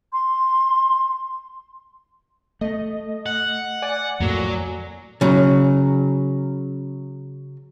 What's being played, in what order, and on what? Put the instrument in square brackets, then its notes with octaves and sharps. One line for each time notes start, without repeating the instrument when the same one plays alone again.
[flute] C6
[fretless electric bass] A3 [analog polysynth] D#5
[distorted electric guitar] F#5
[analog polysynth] D5 G#5
[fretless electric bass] F2 A2 A#3 [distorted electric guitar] F#3
[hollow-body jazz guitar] C#3 F#3